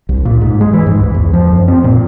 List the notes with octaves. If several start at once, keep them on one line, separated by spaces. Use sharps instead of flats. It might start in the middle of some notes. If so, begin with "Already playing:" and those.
C2
A#2
G#2
G#3
E3
G#2
C#2
E2
F3
F#2
C4
A#2